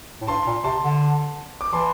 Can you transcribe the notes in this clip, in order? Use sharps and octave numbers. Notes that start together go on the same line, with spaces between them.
A2
G2 A5 C6
A#2
C3 A5 C6
D3
D6
E3 A5 C6